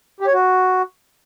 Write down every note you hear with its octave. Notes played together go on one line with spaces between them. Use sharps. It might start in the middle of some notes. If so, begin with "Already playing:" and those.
G4
C#5
F#4